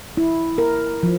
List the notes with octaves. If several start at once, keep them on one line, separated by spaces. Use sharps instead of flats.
E4
A#4
F3